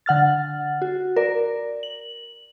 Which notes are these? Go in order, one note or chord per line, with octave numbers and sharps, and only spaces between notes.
D3 F#5 F6 A6
F#4
A#4 D5
F#7